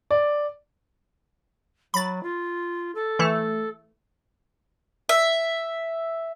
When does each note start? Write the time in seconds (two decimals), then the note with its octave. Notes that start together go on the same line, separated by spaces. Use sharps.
0.11 D5
1.94 F#3 B5 A6
2.23 F4
2.95 A4
3.19 E3 A3
5.09 E5